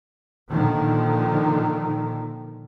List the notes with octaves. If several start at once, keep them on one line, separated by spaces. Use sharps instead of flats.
A#2 D3 D#3 F3